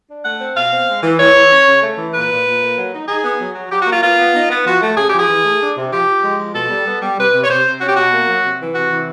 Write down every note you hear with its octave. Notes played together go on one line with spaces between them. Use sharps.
D4
A3 F#5
C4
B2 F5
C4
G#3
E3
E3 C#5
E3
C#4
C#3
A3
E3
A#2 B4
A#2
A#2
A#3
F#3
D#4
D#4 G#4
B3
F#3
F#3
F#3 G4
F#4
A#3
F4
B3 F4
B3
D#4
B3
F3 F#4
A3
C#3 G#4
F3 G4
G#4
E3
A3
D4
C3
F3 G4
F3
G#3
F3
B2 A4
G3
B3
G3
C3 B4
C3
C#5
C3 C5
C3
C#4 F#4
G4
B2 F#4
A#3
F#3
C3
E3
C3 F#4
E3